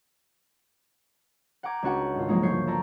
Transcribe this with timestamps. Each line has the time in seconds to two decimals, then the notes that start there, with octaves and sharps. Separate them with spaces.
1.63 F#5 G5 A#5 D6 G#6
1.83 C#2 C#4 D4 F#4 F#5 G5
2.15 G#1 F4
2.28 F3 F#3 G#3 A#3 D#4
2.42 G1 D2 C#3 C#5 G6 C7
2.67 A4 C#5 D5 A#5